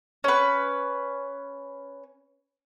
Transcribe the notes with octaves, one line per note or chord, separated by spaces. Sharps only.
C#4 B4